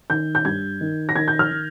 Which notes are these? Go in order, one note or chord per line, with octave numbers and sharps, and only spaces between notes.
D#3 G6
G6
G2 G#6
D#3
A#6
D#3 G#6
G6
F6
D#3